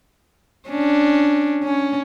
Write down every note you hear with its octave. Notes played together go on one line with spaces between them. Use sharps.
C#4 D4
C#4